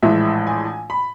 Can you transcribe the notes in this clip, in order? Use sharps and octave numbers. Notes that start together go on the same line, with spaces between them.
A#1 A2 E3 G#3 E5
G#5
B5